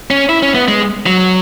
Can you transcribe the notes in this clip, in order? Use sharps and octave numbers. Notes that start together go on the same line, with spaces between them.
C#4
E4
C#4
B3
G#3
F#3